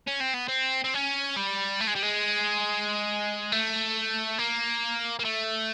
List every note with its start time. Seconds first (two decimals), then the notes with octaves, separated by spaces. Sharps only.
0.08 C#4
0.21 C4
0.34 B3
0.48 C4
0.84 C4
0.94 C#4
1.36 G3
1.80 A3
1.87 G#3
1.95 G3
2.02 G#3
3.52 A3
4.39 A#3
5.19 A#3
5.25 A3